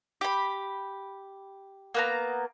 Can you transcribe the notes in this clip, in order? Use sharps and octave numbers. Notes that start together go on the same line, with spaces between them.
G4 B5
A#3 B3 A#5